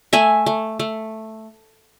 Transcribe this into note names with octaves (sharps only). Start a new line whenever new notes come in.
A3 E5 G#5
A3
A3